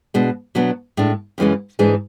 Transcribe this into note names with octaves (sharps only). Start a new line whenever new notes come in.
B2 G#3 D4
B2 F#3 B3 D4
A2 G#3 D4
F#2 C#3 E3 G#3 C#4
G#2 E3 G#3 D4 G#4